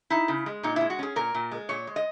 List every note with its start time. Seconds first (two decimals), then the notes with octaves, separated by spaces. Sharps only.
0.10 D#4 E4
0.28 C#3
0.46 G#3
0.63 A#2 D#4
0.76 E4
0.81 G#3
0.90 F#4
0.99 C#4 G#4
1.16 A#2 A#4
1.35 A#2
1.51 G#3
1.69 A#2 C#5
1.87 G#3
1.96 D#5